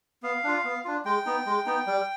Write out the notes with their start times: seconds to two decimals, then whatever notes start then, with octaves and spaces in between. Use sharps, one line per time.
0.23 B3 F5
0.44 D4 F4
0.64 B3
0.85 D4 F4
1.05 G#3 G5
1.26 B3 D#4
1.46 G#3
1.66 B3 D#4
1.87 G3